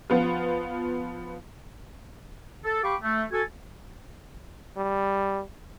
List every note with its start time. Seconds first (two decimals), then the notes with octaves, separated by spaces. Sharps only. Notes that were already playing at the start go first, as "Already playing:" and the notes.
0.10 F3 B3 F4
2.65 A4
2.83 G4 F5 G5 B5 C#6 D6
3.03 A3
3.32 F#4 A4 G#5
4.77 G3